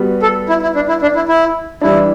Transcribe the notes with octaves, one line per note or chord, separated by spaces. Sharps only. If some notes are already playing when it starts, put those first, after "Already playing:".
Already playing: G3 B3 F#4
A4
E4
E4
D4
E4
D4
E4
E4
E3 G3 D4 E4